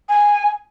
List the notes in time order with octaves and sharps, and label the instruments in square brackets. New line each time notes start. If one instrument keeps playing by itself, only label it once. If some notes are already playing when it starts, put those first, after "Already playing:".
[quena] G#5